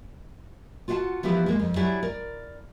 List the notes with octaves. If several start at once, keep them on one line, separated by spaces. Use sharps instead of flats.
F4 F#4 D5 F5 F#5 A5
E3 F3 B3 E4 G4 B4
G#3 A#3
F2
F#3 E4 G4 G#4 D5 E5
A#4 D5